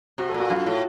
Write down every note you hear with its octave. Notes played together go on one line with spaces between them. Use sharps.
C3 F#4
A4
A#2
F#4
F#2 F4
A2